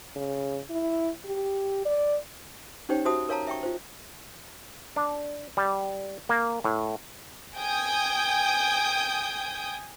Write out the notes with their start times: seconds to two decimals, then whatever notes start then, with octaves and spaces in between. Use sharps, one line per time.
0.16 C#3
0.70 E4
1.25 G4
1.85 D5
2.89 C#4 D#4 G4 C5 C#5 G5
3.05 F#4 G4 C5 E5 A5 D#6
3.29 A#4 C#5 F5 A5 A#5
3.47 E5 G5 C#6
3.63 F4 C5
4.96 D4
5.57 G3
6.29 A#3
6.64 A2
7.57 G5 G#5 D#6 G6 G#6